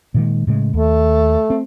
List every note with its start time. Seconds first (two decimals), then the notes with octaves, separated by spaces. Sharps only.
0.14 A#2 D#3 G#3
0.47 A2 C#3 G#3
0.74 D#2 A3
1.50 C4